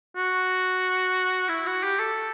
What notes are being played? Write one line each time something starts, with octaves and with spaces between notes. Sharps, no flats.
F#4
E4
F#4
G4
A4